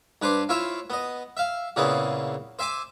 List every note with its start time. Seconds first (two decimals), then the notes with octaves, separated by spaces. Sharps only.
0.22 G2 B4 C5 C6 D6
0.49 E4 F4 C5 C#5 E5
0.90 B3 D#5
1.37 E5 F5
1.76 A#2 C#3 E3 B3 C4 G#4
2.59 C5 E5 G#5 D6